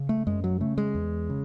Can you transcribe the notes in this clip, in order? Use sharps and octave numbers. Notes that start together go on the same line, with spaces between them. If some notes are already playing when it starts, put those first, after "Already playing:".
Already playing: C#3
A3
F#2 G#3
F#3
C#3 A3
G#3
E2
C#3